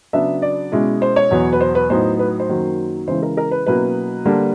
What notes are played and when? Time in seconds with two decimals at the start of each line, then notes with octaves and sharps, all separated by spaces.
0.13 C#3 F#3 B3 D4 E5
0.42 D5
0.72 B2 G#3 C#4 E4
1.02 C5
1.16 C#5
1.31 E2 B2 F#3 B3
1.53 B4
1.61 C5
1.75 B4
1.90 A2 F#3 B3 D#4 C5
2.19 B4
2.40 C5
2.49 F#2 D#3 F#3 A#3
3.08 C#3 E3 G#3 C5
3.22 A#4
3.37 A#4
3.51 B4
3.66 B2 F#3 A#3 C#4 E4 B4
4.25 D3 G3 A#3 D4